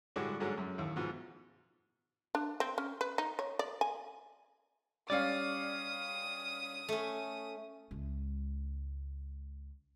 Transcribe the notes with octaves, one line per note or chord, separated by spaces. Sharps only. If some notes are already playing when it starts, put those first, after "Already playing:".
A2 D3 G3 G#3 D4 F#4
G#2 D3 F#3 G#3 A3
F#2
D#2 A2
G#2 B2 F3
D4
C4
C#4
B4
D#4
C#5
D5
G#5
G3 C#4 D5 F5 D#6
A3 C#4
C#2 G#3